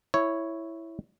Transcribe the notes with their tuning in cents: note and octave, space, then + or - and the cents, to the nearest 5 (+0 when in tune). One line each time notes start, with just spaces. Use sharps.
E4 +0 C#5 +0